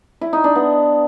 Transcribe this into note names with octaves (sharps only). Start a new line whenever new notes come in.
E4
D#4
D4
B3